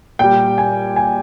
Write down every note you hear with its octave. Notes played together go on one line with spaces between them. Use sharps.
A#2 G3 G5
G#5
G#5